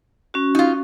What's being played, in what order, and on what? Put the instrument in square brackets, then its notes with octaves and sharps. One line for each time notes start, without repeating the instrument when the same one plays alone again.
[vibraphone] C#4 F#4
[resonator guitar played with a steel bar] D#4 F4